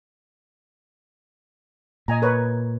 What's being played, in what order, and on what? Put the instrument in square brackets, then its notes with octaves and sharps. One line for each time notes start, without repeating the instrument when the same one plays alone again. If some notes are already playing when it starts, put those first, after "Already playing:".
[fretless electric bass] A#2 [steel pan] D#5 G#5 A#5
[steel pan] A#4 B4 C#5